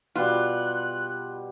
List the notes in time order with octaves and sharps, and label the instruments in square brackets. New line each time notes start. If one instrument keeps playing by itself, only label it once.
[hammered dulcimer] B2 G3 [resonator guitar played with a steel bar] F4 [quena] F#6